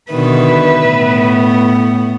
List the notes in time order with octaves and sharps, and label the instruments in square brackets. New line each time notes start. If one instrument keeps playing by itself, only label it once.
[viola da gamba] B2 D3 D#3 [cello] B4 E5
[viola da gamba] A2 B3